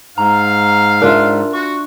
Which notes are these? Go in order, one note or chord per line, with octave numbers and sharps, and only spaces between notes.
G#2 F5 A#5
D4 F4 A#4 E5
F#4 C#6